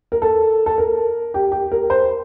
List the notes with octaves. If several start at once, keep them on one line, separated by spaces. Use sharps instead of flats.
A#4
A4
A4
A#4
G4
G4
A#4
C5